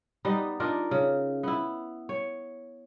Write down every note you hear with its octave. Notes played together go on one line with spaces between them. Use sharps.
G3 B3 D#4
D4 D#4 F4 A#4
C#3
B3 E4
C#5